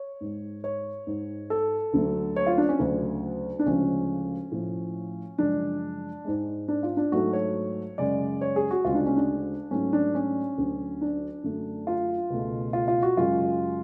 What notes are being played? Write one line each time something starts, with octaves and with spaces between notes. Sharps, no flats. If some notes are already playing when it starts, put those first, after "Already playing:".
Already playing: C#5
G#2 G#3
C#5
G#2 G#3
A4
D2 D3 F#3 A3
C#5
F4
D4
C#4
D2 C#3 F#3 A3 D4
D4
D2 C#3 F3 G#3 C#4
A2 F3 A3
F#2 C#3 F3 G#3 D4
G#2 G#3
D4
F4
D4
G#2 F#3 A3 F#4
C#5
F#2 C#3 G#3 D5
C#5
G#4
F#4
D2 C#3 G#3 F4
D4
C#4
D4
G#2 F#3 A3 C#4
D4
C#4
D2 D3 F#3
D4
F#2 D3 F#3 A3
F4
C#2 B2 A3
F4
F4
F#4
F#2 C#3 G#3 F4